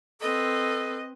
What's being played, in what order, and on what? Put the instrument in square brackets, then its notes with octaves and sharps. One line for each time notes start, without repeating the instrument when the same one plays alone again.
[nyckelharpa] C4 B4 [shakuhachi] A4 [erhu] D#5